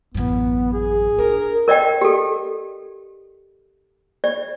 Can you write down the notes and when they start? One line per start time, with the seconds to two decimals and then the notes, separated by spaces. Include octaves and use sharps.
0.15 A1 F#2 B3
0.73 G#4
1.18 D4 A#4
1.68 A#4 D5 D#5 G5
2.01 G4 A4
4.24 D5